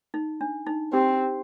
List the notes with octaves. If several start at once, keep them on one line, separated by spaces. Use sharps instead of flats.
D#4
D4
D#4
C4 G4